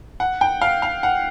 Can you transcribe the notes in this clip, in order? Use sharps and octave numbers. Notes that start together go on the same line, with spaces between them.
F#5
G5
F5
F5
F#5